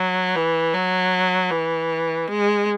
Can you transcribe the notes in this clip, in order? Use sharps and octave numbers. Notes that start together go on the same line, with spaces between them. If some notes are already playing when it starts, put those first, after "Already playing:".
Already playing: F#3
E3
F#3
E3
G#3